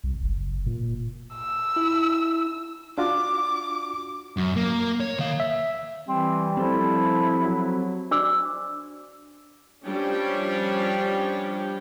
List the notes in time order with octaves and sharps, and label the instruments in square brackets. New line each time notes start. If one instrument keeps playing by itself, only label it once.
[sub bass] C2
F#1
A#2
[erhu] E6
[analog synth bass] E4
[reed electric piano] D4 F4 F#4 [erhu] D6
[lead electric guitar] F#2
A#3
C#5
D#3 F5
[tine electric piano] E5
[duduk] E3 [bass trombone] G3 [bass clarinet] C4
[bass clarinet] F3 [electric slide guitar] C4 G4 A4 [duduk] E4
[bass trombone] F#3
[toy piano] D4 F#4 C5 D5 D6 E6
[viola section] F3 G3 C#4 D4 C#5 G5